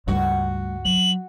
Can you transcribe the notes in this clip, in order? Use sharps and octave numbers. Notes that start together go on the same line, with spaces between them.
C#2 G2 G3 A3 F#4
F#3 F#7